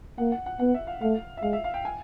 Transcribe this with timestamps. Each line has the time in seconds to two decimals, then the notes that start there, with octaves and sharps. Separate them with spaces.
0.18 A#3 F#5
0.32 F#5
0.46 F#5
0.59 B3 F#5
0.74 E5
0.87 F5
1.01 A3 F5
1.37 E5
1.42 G#3 F5
1.53 E5
1.64 F5
1.74 G5
1.85 G#5